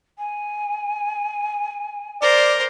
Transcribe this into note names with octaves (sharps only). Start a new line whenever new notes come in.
G#5
A#4 C5 D5